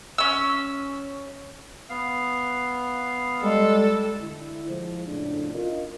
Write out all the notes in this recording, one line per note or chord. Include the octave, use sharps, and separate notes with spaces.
C#4 E6
B3 F5
G3 G#3 A4
D3 E4
F3 G#3 C5
F2 A2 C#3 D4
F4 A#4 D#5